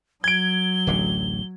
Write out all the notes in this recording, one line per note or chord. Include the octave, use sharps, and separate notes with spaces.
F#3 G#6 D7 G7
D1 A1 D3